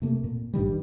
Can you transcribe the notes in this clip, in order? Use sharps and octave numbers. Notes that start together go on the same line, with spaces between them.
C3 A3 A#3
A#2
G#1 G2 D#3 G3